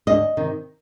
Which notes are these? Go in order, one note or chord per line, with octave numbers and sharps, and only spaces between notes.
D2 D#5
C3 D#3